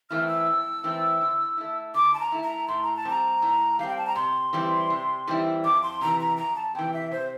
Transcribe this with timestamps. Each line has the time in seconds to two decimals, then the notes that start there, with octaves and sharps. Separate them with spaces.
0.10 E3 A3 C4 E4 F6
0.28 E6
0.47 F2
0.84 E3 A3 C4 E4
1.21 D3
1.57 A3 E4
1.94 D3 D6
2.14 A5
2.19 A#5
2.32 A3 E4
2.43 A#5
2.68 A2 C6
2.83 A#5
2.96 A5
3.05 G3 C4 A#5
3.42 A2
3.79 G3 C4 F5
3.88 G5
3.98 A5
4.06 A#5
4.16 C3 C6
4.53 E3 G3 C4 E4
4.90 C3
5.27 E3 G3 C4 E4
5.64 F2 D6
5.83 C6
6.01 C3 E3 A#5
6.20 A#5
6.37 F2 A#5
6.56 A5
6.75 C3 E3 G5
6.94 E5
7.11 C3 C5